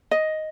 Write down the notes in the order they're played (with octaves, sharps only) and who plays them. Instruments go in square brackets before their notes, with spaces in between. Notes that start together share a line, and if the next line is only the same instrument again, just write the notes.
[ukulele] D#5